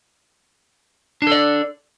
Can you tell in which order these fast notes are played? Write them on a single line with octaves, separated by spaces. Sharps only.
D4 A4 D5